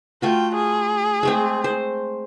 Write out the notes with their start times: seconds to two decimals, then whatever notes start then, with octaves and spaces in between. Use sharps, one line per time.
0.22 A3 F4 F#4 G5
0.55 G#4
1.23 G#3 A3 C4
1.64 C5